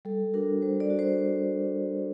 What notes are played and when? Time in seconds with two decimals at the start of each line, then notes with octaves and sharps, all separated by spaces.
0.05 G3 A4
0.33 D4 F#4 A#4
0.62 G3 C5
0.80 D5
0.90 D4 F#4
0.99 C5